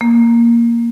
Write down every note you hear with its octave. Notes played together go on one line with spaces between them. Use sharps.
A#3